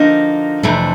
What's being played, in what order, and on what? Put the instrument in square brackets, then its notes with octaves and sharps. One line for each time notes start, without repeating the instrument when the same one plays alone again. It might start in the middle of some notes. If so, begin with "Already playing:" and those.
Already playing: [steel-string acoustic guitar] D3 F3 A#3 D#4
F2 C3 E3 A3 D4